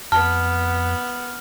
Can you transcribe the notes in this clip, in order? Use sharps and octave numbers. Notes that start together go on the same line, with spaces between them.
F2 B3 A5 F6